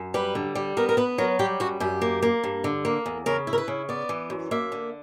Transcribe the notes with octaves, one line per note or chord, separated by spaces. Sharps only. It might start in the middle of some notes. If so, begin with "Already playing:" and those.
Already playing: F#2
G3 B4
D3
G3
B3 A#4
A#4
B3 B4
F#3 A#4
G3 G4
F#2 F#4
F#2 G4
A#3
A#3
G2
D3
A#3
E2
C#3 A#4
E4
A#4
B4
C#3
B3 D5
E3
F#2
A#3 E5
D3